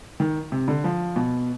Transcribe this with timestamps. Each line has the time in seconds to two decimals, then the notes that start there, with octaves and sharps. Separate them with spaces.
0.20 D#3
0.52 C3
0.68 D3
0.84 F3
1.16 B2